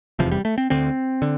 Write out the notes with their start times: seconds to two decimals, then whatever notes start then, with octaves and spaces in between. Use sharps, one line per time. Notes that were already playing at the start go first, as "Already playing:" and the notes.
0.19 F1 E2 C3 F3
0.32 G3
0.45 A3
0.58 C4
0.70 D2 D3 C4
1.22 D3